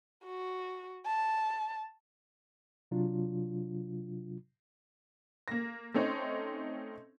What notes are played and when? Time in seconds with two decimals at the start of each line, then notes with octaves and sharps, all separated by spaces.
0.25 F#4
1.06 A5
2.91 C3 F#3 D4 F4
5.48 A#3 A#6
5.94 A3 C4 C#4 D#4 C5